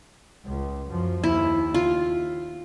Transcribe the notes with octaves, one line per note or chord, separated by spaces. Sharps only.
C#2
F#2 F3
D#2 E4
F4